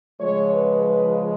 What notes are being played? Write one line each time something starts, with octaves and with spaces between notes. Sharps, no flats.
C#3 F3 G#3 C#5
B4
B4